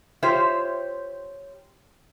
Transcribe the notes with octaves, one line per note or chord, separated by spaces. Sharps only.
F4 G4 C5 C#5 E5